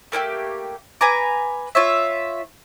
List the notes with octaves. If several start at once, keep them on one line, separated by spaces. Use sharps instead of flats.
A3 A#3 E4 G4
B4 G#5 A#5 D6
F4 C#5 E5